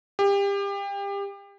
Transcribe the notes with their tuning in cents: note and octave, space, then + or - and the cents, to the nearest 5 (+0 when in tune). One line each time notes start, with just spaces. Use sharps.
G4 +30